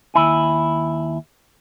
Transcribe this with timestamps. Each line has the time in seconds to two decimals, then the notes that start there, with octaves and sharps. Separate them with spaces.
0.14 D#2 E4 G#5